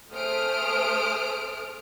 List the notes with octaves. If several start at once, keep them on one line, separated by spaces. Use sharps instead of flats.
A3 G#4 C5 D#6 F6 D7